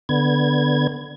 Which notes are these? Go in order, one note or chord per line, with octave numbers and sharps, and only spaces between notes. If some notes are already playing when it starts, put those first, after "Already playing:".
D3 B3 G#6